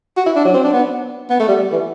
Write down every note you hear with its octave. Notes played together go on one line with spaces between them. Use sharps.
F#4
E4
D4
F#3
C4
D4
B3
B3
A3
G3
E3